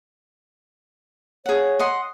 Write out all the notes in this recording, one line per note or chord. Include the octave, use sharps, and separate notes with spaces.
G#4 C#5 F#5
D#5 F#5 C6